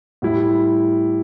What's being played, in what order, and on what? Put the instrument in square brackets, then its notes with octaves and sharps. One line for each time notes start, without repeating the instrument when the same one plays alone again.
[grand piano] A2 G3 E4